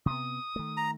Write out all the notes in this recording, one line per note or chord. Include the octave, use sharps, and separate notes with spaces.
C3 B3 D#6
D#3 A3
A#5